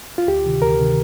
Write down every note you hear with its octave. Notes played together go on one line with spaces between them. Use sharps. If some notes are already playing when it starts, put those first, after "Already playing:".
F4
D2 G4
C3 D#3
D2 A#4
C3 D#3